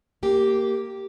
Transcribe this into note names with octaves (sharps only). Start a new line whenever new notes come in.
A#3 G4